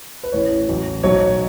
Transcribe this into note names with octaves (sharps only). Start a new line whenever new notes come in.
B4
A1 A2 E3 C#5
A1 A2 F#3
B1 B2 F#3 C#5